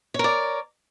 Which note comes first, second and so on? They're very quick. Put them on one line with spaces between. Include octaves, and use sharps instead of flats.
C#5 A#4 D5